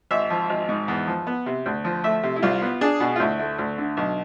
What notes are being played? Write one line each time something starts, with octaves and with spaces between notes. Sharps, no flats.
G#1 E5
F3
G#1
G#2
E2
F3
B3
C3
D2
F3
A3 E5
C3
E4
C2 F4
B3
D4 G#4
B2
F4
D2 E4
A3
D2
D3
B1